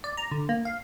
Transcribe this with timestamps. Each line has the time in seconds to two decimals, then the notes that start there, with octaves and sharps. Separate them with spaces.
0.04 D5
0.17 A#5
0.31 D3
0.49 A#3
0.65 F5